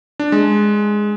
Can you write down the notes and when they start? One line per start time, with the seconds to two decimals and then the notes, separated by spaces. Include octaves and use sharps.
0.19 D4
0.32 G#3